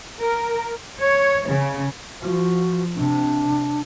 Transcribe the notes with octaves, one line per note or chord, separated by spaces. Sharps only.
A#4
C#5
C#3
F3 F#4
C3 D4